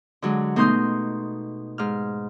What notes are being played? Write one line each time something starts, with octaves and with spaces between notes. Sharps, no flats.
D3 F#3 G#3
B2 A3 D#4 C6 D#6 G6
G#2 F6